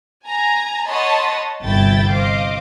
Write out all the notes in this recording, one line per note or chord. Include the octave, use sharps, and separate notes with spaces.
G#5 A#5
C#5 D#5 F#5 A5 B5 C6
G1 C2 E4 G5 A6
C5 D#5 F5 D6